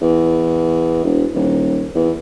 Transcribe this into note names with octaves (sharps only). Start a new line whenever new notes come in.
E2
E1
D#1
E2